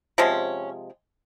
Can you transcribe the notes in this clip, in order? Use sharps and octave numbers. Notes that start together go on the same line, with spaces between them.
C3 F3 G#3 C#4